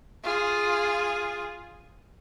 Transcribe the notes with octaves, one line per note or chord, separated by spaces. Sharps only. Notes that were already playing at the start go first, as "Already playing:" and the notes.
F4 G#4